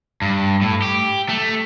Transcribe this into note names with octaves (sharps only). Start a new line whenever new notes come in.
G2
A2
G4
A3